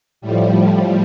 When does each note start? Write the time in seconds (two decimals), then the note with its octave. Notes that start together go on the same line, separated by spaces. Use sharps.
0.21 A2 F3 G3